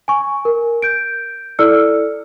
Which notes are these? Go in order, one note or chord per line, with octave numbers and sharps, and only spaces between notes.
G#5 C#6
A#4
G6 D7
E4 A4 D5 E6 F6 C#7